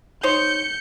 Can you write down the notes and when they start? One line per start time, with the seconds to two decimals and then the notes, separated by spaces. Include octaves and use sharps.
0.23 D#4 C5 C#5 G6 C#7